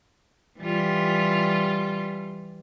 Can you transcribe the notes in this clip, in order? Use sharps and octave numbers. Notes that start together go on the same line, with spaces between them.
E3 G3 F4